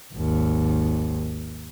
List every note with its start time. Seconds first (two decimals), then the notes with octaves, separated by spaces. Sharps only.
0.14 G#1 D#2